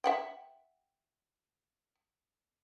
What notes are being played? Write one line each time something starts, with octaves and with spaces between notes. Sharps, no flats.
E5 F#5 G5